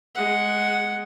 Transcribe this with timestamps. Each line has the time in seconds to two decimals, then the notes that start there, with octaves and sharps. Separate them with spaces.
0.15 G#3 F#5